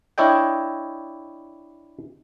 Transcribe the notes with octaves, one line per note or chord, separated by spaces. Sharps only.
D4 E4 C#5 D#5 G5